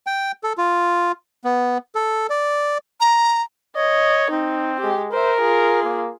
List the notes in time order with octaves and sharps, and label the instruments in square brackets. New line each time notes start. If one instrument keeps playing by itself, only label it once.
[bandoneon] G5
A4
F4
B3
A4
D5
[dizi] A#5
[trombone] C#5 [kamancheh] D#5
[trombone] C4 [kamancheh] D#4
[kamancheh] G#3 G4
[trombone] A#4 [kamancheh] C5 E5
[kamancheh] F4 G#4
[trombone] A#3